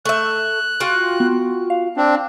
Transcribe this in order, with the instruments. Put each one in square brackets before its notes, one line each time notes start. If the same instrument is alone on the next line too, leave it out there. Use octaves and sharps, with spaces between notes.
[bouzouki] A3 E5 [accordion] F#6
[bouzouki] F4 F#4 G5
[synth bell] B3
F5
[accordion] C4 D4